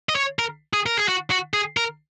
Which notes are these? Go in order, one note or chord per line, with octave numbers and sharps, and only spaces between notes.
D#5
C#5
A#4
G#4
A#4
G#4
F#4
F#4
G#4
A#4